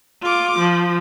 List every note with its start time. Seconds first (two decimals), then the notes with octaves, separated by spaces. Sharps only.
0.22 F4 D6
0.58 F3